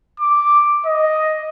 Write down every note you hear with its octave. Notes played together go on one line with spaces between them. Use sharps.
D6
D#5